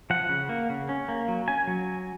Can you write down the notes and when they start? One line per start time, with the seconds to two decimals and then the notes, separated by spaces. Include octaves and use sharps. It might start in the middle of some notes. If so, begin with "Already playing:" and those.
0.10 F3 F#5
0.29 C#3
0.49 A#3
0.70 C#3
0.89 C#4
1.08 A#3
1.28 F#3
1.48 C#4 G#5
1.67 F#3